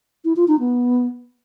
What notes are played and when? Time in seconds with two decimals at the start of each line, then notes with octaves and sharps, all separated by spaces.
0.25 E4
0.36 F4
0.48 D#4
0.60 B3